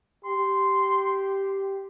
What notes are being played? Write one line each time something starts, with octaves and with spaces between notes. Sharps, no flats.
G4 C6